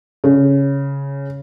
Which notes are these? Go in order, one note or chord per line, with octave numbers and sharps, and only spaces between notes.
C#3